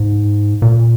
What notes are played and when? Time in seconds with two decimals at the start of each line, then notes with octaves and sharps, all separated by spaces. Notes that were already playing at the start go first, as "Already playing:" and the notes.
Already playing: G#2
0.62 A#2